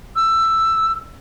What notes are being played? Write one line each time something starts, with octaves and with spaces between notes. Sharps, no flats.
E6